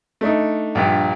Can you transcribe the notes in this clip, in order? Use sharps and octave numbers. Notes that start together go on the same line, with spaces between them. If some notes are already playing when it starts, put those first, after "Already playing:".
A3 D4 D#4
A#1 G2 A#2